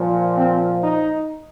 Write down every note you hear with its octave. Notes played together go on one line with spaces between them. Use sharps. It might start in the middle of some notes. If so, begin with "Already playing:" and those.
Already playing: A#2 F3
C4
D#4